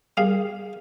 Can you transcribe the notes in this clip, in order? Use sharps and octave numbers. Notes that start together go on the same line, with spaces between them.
G3 A#3 G#4 F5